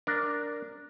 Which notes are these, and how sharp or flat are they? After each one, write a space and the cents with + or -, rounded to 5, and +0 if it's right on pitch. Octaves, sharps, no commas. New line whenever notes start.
D4 +0 A#4 +0